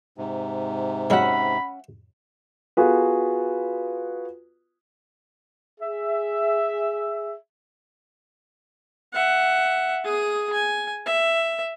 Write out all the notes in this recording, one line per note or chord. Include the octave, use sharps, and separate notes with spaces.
G#2 C3
F#3 G#3 C#4 E5 F#5 B5
B3 F4 F#4 G#4 A4 B4
G#4 E5
E5 F#5
G#4 D#6
G#5
E5